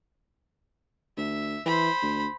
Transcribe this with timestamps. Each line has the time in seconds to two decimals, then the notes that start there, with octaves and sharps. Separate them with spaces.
1.17 D2 E5
1.66 E3 C5 B5
2.02 D2